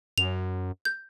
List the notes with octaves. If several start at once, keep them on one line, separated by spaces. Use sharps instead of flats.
F#2 F7
G6